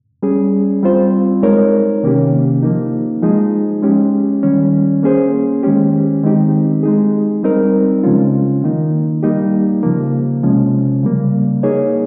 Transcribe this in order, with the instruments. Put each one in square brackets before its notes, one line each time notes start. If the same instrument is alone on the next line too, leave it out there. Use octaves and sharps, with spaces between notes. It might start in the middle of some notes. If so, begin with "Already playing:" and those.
[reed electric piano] G3 C#4 G#4
G3 C4 F4 C5
G#3 D#4 A#4 C#5
C3 D#3 A#3 C#4 G4
F3 A#3 D#4
F3 G#3 D#4 G#4
G#3 C#4 G4
D#3 G3 C#4
A#3 C#4 G#4 C5
D#3 G#3 C#4 G4
D#3 G#3 C4 D#4 G4
G#3 D#4 G#4
G3 C4 D#4 A#4
C#3 F3 G#3 C#4 F4
D#3 A#3 D#4
G3 A#3 D#4 G4
C#3 F3 A#3
C3 F3 G#3 C#4
C#3 G3 A#3
A#3 D#4 G#4 C#5